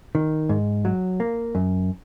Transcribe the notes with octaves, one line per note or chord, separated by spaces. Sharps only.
D#3
G#2
F#3
A#3
F#2